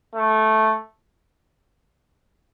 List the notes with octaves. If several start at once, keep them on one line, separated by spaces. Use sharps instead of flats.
A3